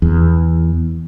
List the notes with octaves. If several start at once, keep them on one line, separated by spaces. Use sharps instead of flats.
E2